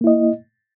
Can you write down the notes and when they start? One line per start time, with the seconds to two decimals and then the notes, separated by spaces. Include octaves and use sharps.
0.01 A#3
0.04 E4
0.07 D#5